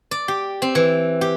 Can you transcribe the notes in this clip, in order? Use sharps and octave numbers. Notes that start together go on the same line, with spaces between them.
D5
G4
C4
E3
G4